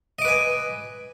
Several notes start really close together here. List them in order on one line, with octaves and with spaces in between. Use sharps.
D#5 D6 B4 G#5